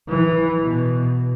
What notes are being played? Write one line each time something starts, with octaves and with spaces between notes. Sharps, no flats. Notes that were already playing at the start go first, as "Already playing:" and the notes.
E3
B2